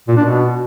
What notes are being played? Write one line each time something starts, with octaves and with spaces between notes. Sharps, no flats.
A#2
D4
B2